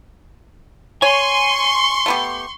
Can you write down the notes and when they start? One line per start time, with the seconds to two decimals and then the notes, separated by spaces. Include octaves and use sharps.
1.02 C#5 G#5 C6 C#6
2.06 A3 B3 G4